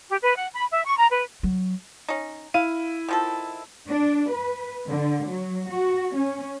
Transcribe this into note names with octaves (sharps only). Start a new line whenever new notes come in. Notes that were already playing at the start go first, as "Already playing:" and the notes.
G4
B4
F#5
B5
E5
C#6
A#5
B4
F#3
C#4 D#4
E4 F5 D#7
D#3 F3 A4
D4
B4
D3
F#3
F#4
C#4